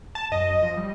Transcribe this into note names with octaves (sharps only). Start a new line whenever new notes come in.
A5
F#2 D#5
F3
G3